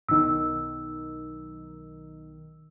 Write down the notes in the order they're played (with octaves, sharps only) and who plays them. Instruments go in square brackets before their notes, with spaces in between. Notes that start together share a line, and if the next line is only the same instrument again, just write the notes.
[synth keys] B1 D#3 [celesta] E6